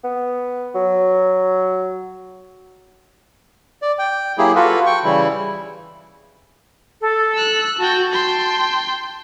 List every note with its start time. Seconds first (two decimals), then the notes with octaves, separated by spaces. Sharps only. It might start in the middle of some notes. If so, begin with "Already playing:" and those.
0.04 B3
0.75 F#3
3.82 D5
3.99 G5
4.38 F#3 A#3 E4 G4 G#4
4.56 F4 F#4 A4 B4
4.86 G5 C#6
5.04 C#3 E3 G3 E4
7.01 A4
7.34 E6 F#6
7.79 F#4 G5 A5
8.12 G5 C6